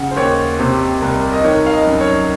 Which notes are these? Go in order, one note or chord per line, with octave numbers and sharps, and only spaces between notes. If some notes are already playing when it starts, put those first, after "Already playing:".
Already playing: C#3 F#5
C5
D#2 C#5
C3 C5
C2
D#5
D#3 C#5
F5
D#5
F#2
C#5